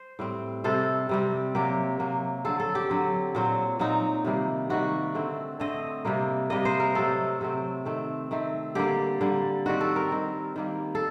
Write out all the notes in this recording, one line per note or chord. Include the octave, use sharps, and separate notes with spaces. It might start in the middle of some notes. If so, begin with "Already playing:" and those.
Already playing: C5
A2 G3 C4
C3 G3 C4 A4
C3 G3 C4
C3 F#3 A#3 G4
C3 F#3 A#3
D3 F#3 C4 A4
A4
G4
D3 F#3 C4
A#2 F#3 C4
A#2 F#3 C4 D#4
C3 D#3 G3 A#3
C3 D#3 G3 A#3 F#4
D3 A3 C4
D3 A3 C4 D#5
C3 G3 A#3
C3 G3 A#3 D#5
C5
A#4
C3 F#3 A3 C4 A4
C3 F#3 A3 C4
D#3 A3 C4
D#3 A3 C4
D3 G3 A#3 G4
D3 G3 A#3
D#3 G3 C4 F#4
A4
A#4
D#3 G3 C4
D#3 G3 A#3
A4